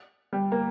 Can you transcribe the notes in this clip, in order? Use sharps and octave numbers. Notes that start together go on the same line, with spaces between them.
G3
A#3